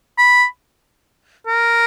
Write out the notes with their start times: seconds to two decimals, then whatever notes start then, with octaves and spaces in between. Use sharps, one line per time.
0.18 B5
1.47 A#4